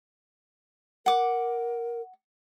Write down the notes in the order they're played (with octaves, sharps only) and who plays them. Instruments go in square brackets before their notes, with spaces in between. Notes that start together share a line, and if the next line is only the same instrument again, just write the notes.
[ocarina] A#4 [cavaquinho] F#5 D6